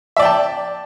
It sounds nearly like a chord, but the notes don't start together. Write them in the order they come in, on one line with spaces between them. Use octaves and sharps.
E5 D5 G5 A5